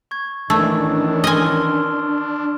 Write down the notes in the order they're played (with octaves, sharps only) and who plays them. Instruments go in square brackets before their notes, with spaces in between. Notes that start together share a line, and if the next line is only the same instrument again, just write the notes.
[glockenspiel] C#6 G#6
[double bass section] D#3 E3 C#4 [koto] A3 [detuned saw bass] D4 [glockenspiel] E6 G#6
[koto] D#5 G#5 [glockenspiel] C6 F6 G7